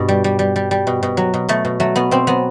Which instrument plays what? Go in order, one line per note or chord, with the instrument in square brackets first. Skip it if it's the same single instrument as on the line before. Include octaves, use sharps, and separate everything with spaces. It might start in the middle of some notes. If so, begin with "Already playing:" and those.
Already playing: [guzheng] G2 B2
G3
G3
G3
G3
G3
B2
B2
F#3
B2
B2 A3
B2
F#3 A3
B2 B3
B2 C4
F#3 B3